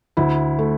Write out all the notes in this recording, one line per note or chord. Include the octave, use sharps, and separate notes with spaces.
D2 E4
A3